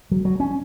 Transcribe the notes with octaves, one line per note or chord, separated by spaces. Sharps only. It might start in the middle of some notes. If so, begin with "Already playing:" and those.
F#3
F#3
C#4